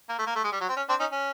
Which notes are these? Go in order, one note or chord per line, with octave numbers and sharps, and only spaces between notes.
A#3
A3
A#3
A3
G#3
G3
F#3
C4
C#4
C4 D4
C#4 D#4
C#4